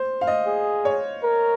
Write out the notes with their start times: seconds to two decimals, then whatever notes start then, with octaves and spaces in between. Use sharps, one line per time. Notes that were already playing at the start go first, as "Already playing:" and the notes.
Already playing: C5
0.21 F5
0.27 D#5
0.46 G#4
0.85 C#5
1.23 A#4